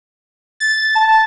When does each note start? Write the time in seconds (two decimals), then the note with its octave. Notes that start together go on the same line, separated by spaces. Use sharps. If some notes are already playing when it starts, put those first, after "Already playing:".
0.60 A6
0.95 A5